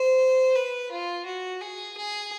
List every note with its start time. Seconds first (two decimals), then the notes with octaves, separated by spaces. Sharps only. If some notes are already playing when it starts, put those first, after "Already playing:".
Already playing: C5
0.55 B4
0.91 F4
1.26 F#4
1.61 G#4
1.97 G#4